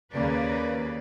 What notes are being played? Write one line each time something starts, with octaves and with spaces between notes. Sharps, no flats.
D#2 C#3 A#3 B4 D5